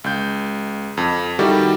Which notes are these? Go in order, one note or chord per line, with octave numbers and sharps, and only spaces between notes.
C#2 G6
F2
D#3 G3 E4 F#4 G4 A4